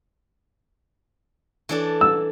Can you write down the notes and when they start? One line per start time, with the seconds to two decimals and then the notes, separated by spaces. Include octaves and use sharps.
1.69 E3 D4 A4
2.01 E6